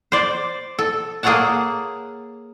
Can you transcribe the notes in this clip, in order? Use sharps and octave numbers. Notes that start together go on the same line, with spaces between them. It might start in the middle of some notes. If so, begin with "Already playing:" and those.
C5 D5
A4
A#3 G#4 A4 C#5 F#5 A5